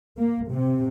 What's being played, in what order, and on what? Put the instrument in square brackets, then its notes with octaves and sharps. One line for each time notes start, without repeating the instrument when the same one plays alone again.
[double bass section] A#3
C3